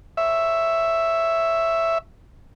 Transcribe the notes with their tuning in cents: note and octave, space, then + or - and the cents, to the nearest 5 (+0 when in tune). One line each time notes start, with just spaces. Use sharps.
C#5 +0 E5 +5